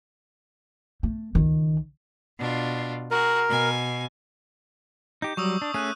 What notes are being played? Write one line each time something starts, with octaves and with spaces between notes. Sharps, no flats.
A3
C#2 D#3
B2 D4 F4
F#4 G#4 A#4
B2 G#5
D#4 G4 G6
F#3 G3 C#6 D#6 E6
D4
A3 C#4 G#4 F#6 D#7